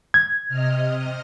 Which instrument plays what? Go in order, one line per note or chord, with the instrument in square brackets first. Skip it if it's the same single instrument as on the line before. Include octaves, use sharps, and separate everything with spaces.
[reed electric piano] G#6
[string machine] C3 D#5 F6